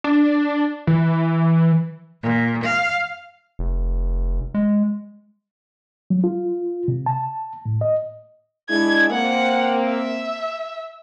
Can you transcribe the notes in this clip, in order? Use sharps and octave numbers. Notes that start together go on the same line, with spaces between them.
D4
E3
A#2
F5
F1
G#3
F#3
F4
C3
A5
A2
D#5
G#3 D4 E4 G#6
A#3 C4 F#5
E5